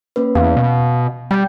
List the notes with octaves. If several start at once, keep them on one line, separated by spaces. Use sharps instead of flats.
A#3 C#4 B4
E2 F5
B2
G3 G5 G6